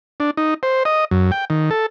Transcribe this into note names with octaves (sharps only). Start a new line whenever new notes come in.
D4
D#4
C5
D#5
F#2
G5
D#3
A4